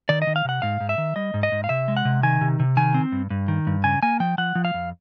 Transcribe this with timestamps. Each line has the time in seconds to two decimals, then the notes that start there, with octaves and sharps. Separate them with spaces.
0.09 D#3 D5
0.22 D#5
0.27 D#3
0.36 F5
0.45 C3 F#5
0.62 G#2 F5
0.80 G#2
0.89 E5
0.98 D#3
1.16 G3 D#5
1.34 G#2
1.43 D#5
1.52 G#2
1.64 F5
1.69 C3 E5
1.88 G#3
1.97 F#5
2.05 C3
2.23 D#3 G#5
2.41 C3
2.60 C3
2.77 D#3 G#5
2.94 C4
3.12 G2
3.30 G2
3.48 D#3
3.67 G2
3.84 C#3 G#5
4.03 A#3 G#5
4.20 F3 G5
4.38 F3 F#5
4.55 F3
4.65 F5
4.74 F2